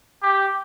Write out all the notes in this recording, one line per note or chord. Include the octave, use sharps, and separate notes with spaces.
G4